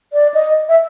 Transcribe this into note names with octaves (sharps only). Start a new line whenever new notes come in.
D5
D#5
E5